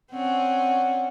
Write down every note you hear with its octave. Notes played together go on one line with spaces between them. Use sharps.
C4 C#4 C#5 D5 F#5